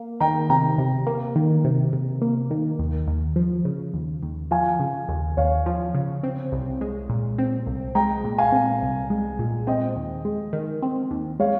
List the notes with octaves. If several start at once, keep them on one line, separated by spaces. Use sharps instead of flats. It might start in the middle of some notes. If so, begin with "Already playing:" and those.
Already playing: A#3
D#3 G5 A#5
C3 G5 A#5
C3
A#3
D#3
C3
C3
A#3
D#3
D#2
D#2
F3
C#3
D#2
D#2
F3 F5 G#5
C#3
D#2
D#2 C#5 F5
F3
C#3
C4
C2
G#3
A#2
C4
C2
G#3 G5 A#5
A#2
F5 G#5
C4
C2
G#3
A#2
C4 D#5 G5
D#2
G#3
D#3
C4
D#2
G#3 C#5 F5